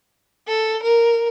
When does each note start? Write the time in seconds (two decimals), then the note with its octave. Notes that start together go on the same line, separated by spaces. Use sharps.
0.47 A4
0.82 A#4